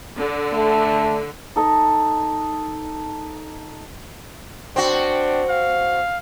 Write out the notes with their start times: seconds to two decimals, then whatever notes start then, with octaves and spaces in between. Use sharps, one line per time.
0.16 D3
0.53 A3
1.56 D#4 A4 D#5
4.76 C4 D4 F#4
5.49 F5